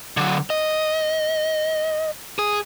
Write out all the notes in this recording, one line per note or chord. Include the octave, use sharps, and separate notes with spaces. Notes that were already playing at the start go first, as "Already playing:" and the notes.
D3 F#3
D#5
G#4